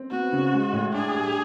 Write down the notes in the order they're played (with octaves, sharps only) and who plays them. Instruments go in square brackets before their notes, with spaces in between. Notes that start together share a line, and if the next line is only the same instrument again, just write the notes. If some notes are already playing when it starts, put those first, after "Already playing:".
Already playing: [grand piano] C4
[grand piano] B3 [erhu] F#4
[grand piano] C#3
G#3
A2
[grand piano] D4 [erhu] G#4
[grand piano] G3